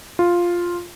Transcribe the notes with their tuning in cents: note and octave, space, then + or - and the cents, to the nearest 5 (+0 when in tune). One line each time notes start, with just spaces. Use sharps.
F4 +0